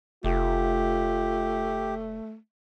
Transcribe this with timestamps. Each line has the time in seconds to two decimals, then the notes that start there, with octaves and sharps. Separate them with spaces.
0.24 F1 A3 F4 G4